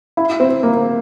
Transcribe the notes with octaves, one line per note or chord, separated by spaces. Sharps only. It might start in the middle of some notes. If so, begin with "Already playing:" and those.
E4
C4
A#3